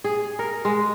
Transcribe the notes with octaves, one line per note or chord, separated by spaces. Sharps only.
G#4
A#4
G#3